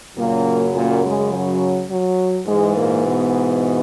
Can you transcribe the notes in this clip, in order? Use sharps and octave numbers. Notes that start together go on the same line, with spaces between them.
F#2 A#2 C#3 F#3 A#3
A#2 A#3
G#3
F#3
F#3
G#2 E3 G#3
A#2 A#3
B2 B3